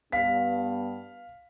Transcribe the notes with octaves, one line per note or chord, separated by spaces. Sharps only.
G2 B3 F5 B6